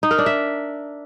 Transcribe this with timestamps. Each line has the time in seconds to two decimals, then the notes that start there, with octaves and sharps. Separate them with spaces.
0.03 D#4
0.11 A#4
0.18 D4
0.26 E5